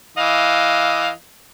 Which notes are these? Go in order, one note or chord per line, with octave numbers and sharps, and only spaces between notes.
E3 D#5 F5